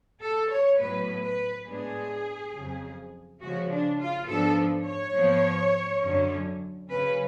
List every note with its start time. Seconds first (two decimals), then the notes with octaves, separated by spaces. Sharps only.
0.21 A4
0.50 C#5
0.79 A2 F#3 B3 B4
1.23 B4
1.67 A2 G#3 B3 D4 G#4
2.54 F2 C#3 F#3
3.41 C#3 F3 G#3 F#4
3.70 D4
4.00 F4
4.29 G#2 F3 B3 D4 A4
4.87 C#5
5.16 G#2 F3 B3
6.04 F#2 D3 F#3 C#4
6.90 C#3 F#3 C#4 B4